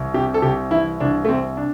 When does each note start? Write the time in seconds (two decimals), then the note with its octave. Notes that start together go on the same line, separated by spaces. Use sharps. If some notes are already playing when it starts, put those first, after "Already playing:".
Already playing: C2
0.14 C3 G4
0.34 A4
0.42 C2 G4
0.71 E3 E4
1.00 C2 D4
1.25 A3
1.29 C3 C4
1.57 D4